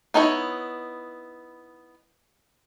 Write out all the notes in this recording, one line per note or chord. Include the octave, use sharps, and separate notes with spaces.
B3 D#4 E4 A#4 C#5